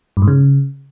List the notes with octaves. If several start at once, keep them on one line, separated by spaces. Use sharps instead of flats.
G2
G#2
C#3